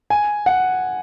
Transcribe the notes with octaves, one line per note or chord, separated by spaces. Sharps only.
G#5
F#5